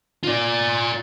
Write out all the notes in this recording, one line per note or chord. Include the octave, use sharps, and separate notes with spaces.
F4 D5